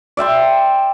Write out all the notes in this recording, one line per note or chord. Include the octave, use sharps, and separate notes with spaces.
D5 E5 G5 C6